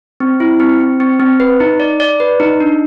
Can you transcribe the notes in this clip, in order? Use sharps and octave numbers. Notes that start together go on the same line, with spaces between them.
C4
E4
C4
C4
C4
C4
B4
D#4
D5
D5
B4
D#4
D4